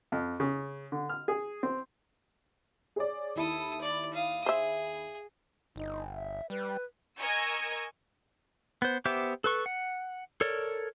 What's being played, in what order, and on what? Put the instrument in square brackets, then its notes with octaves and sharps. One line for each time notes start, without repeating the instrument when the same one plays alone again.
[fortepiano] F2
C#3
D3
F6
G#4
C4
[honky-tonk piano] G#4 C#5 D5
[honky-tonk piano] D#2 E4 [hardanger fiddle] A4 D#6
[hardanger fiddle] D5
F5 D#6
[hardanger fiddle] G#4 [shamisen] C5 E5
[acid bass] G1 [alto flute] D#4
[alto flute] E5
[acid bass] G3 [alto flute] B4
[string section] A#4 D#5 G#5 C#6 E6 G#6
[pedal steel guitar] B3 C5
B3 G4 C5 E5 D6
A4 B4 C#6
F#5
A4 A#4 C#5 D5